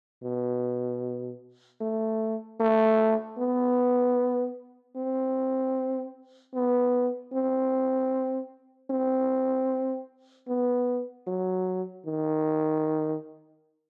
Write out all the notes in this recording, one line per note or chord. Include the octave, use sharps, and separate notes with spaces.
B2
A3
A3
B3
C4
B3
C4
C4
B3
F#3
D#3